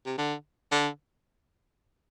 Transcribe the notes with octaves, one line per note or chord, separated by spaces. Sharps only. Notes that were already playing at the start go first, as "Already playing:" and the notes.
C3
D3
D3